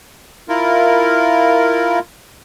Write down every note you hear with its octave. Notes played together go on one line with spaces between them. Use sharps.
E4 F4 A#4